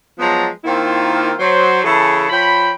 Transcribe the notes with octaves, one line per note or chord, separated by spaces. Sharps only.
F3 F#3 G#3 B3 A5 A#5
D#3 A#3 C4 E4 F4
F#3 C5
C#3 E3 E4 G#4 A4
F3 C#5 G5 B5